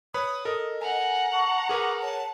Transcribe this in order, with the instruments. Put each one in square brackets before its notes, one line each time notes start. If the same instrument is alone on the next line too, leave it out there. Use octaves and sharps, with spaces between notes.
[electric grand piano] B4 C#5 B5 [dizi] D#6
[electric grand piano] A4 A#4 [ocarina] D#5
[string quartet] F#5 A#5 [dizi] G#5
[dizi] A5 [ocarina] C#6
[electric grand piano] G#4 A#4 B4 [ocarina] C#6 [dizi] D6
[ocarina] C#5 [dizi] A5